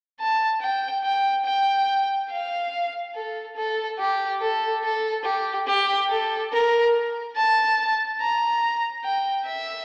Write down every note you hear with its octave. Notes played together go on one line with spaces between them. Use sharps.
A5
G5
G5
G5
F5
A4
A4
G4
A4
A4
G4
G4
A4
A#4
A5
A#5
G5
E5